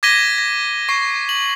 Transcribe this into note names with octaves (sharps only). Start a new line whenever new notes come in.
D6 G#6 A#6 B6 D#7 G7
A#6
C#6 C7
F#7